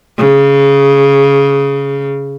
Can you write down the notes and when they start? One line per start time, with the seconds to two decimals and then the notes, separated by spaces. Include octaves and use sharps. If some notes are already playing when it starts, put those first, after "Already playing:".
0.18 C#3